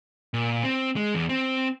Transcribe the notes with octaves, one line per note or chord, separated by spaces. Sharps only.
A#2
C4
G#3
E2
C4